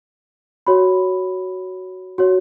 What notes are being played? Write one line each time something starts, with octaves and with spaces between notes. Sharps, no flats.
F#4 C#5 B5
F#4 C#5